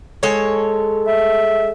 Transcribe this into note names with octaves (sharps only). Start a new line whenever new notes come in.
G#3 A4 C#5
E5